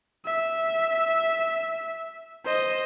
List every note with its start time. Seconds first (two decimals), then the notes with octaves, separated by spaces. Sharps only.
0.25 E5
2.45 C5 D#5